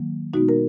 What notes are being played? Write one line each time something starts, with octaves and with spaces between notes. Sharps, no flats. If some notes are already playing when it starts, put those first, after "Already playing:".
Already playing: D#3 F#3 A#3
B2 G#3 B3 D#4 F#4
A#4